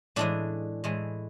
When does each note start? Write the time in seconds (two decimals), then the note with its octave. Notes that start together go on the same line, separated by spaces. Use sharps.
0.16 A2 E3 G#3 D4
0.84 A2 E3 G#3